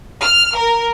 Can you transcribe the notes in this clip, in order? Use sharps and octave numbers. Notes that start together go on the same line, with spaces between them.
F6
A#4